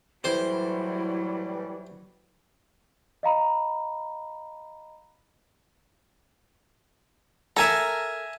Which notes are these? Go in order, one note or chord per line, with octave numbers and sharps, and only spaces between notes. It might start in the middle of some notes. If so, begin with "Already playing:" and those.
A2 E3 F#3 G3 E4 C5
D#5 F5 A#5 B5
A4 A#4 E5 G#5 A#5